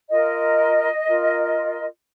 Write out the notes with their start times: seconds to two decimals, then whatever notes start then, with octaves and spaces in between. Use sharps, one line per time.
0.09 F4 A#4 D#5
1.06 F4 A#4